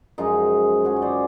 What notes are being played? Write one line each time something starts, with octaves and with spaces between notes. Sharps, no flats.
F#2 C#3 F3 G#3 D#4 F4
F#2 C#3 F3 G#3 F#4 G#4
C#5
C5 D5